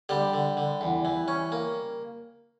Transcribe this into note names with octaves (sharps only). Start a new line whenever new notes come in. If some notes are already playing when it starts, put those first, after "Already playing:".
D3 G3 G4
D3
D3
E2
E3
C#4
A#3